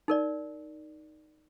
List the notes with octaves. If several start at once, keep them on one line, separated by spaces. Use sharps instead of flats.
D#4 A#4 D5